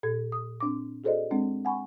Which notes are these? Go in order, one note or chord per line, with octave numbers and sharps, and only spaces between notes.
A#2 A4 G#6
D#6
C4 D4 D6
F#4 G#4 A4 C5 D5 D#5
G#3 C4 D4
F#5 G#5 B5 C#6